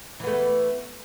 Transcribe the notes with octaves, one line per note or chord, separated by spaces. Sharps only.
E3 A3 B3